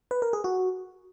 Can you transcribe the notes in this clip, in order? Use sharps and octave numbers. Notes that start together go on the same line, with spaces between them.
B4
A#4
G#4
F#4